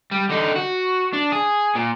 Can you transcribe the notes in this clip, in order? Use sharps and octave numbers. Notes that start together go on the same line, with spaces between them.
G3
D3 D#4
F#4
D4
G#4
A#2